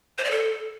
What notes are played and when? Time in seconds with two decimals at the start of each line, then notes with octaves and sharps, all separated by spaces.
0.18 C5
0.25 D5
0.31 A4